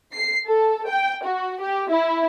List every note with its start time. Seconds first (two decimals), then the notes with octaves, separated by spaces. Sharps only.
0.13 C7
0.46 A4
0.88 G5
1.24 F#4
1.61 G4
1.90 E4